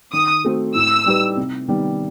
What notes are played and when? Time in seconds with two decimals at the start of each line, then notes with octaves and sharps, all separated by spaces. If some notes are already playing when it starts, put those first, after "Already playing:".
0.12 D#3 D#6
0.44 A3 C4 F#4 C5
0.75 A2 E6
1.06 G3 D#4 G4 B4
1.37 C3
1.68 D#3 G3 B3